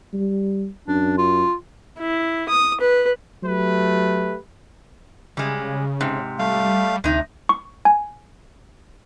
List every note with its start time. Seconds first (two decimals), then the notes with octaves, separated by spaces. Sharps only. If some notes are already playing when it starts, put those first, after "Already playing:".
0.13 G3
0.88 F#2 D4
1.18 F4
2.00 E4
2.49 D#6
2.81 B4
3.44 F#3 A3 G4 B4
5.37 C#3 G3 G#3
6.00 G#2 C3
6.39 G3 A3 F5
7.04 D2 C3 D#4
7.49 C#6
7.85 G#5